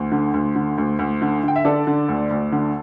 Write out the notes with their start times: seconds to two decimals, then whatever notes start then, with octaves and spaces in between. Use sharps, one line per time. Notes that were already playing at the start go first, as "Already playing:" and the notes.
Already playing: D2
0.12 D3
0.34 D2
0.55 D3
0.78 D2
0.99 D2
1.22 D3
1.43 D3 G5
1.56 E5
1.65 D3 A4 D5
1.87 D3
2.08 D2
2.31 D2
2.52 D3